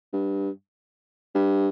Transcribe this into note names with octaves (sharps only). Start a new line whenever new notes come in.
G2
G2